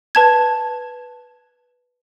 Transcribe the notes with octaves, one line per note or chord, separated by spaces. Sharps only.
B4 A5 G#6